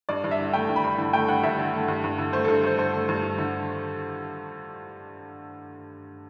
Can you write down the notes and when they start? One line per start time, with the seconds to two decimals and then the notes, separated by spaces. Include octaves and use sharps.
0.09 G2 D5
0.24 G2
0.31 E5
0.39 D3
0.53 A3 G5
0.69 G2
0.76 B5
0.84 G2
0.98 D3
1.13 A3 G5
1.28 G2 F#5
1.43 G2 E5
1.59 D3
1.74 A3
1.88 G2
2.04 G2
2.18 D3
2.33 A3 C5
2.45 G2 A4
2.63 G2 C5
2.78 D3 C5
2.93 A3
3.09 G2
3.23 G2
3.38 D3